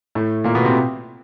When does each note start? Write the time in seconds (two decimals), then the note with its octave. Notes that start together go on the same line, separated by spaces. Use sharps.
0.15 A2 A3
0.44 A#2 A#3
0.55 B2 B3
0.65 C3 C4